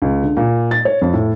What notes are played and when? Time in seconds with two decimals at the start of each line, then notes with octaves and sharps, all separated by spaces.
0.02 C#2
0.23 D3
0.37 A#2
0.71 A6
0.85 C#5
1.01 F2
1.14 A2